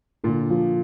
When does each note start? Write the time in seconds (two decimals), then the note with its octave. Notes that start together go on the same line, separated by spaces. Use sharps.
0.24 A#2 D3
0.50 F3